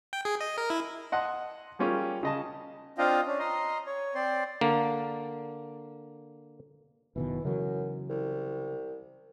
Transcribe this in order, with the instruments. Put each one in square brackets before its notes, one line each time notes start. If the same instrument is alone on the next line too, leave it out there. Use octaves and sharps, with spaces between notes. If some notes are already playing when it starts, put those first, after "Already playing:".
[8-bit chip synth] G5
G#4
D#5
A#4
E4
[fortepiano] D#5 F#5 A5 C6
G3 A#3 C#4 F4 G4 G#4
C#3 D#5 A5
[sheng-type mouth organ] C4 D4 F4 D#5 F5 G5
C#4 D4
D#5 A#5 C6
C#5
C4 C5 D5 C6
[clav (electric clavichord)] D3 A#3
[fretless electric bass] F#1 B2 D#3 [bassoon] E3
[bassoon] F#2 [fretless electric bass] C#3 E3 F#3
[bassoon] C2